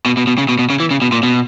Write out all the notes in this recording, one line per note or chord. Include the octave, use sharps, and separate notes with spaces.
B2
B2
B2
C#3
B2
B2
C#3
E3
C#3
B2
A#2
B2